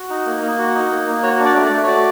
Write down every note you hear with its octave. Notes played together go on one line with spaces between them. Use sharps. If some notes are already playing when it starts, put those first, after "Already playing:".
Already playing: F#4
D#4
A#3
A#3
F#4
D#4
A#3
A#3
F#4 C#5
D4
D5
A3
D5
A3
C#5
F#4 D5